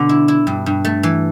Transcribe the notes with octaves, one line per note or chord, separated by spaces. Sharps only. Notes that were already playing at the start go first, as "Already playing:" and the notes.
Already playing: B2 D3
E4
E4
G2
G2
A3
E3